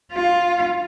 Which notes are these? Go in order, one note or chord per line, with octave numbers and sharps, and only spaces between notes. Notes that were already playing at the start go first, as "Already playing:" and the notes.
F4